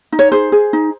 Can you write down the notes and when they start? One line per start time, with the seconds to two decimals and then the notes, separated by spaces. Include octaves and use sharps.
0.12 D#4
0.19 C#5
0.32 G#4 C5
0.52 G#4
0.73 D#4